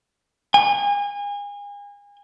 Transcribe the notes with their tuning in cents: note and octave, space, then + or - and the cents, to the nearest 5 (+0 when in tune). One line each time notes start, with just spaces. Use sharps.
G#5 -35